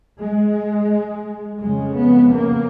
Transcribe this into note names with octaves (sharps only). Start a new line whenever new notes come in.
G#3
F2 C#3 G#3
B3
A#3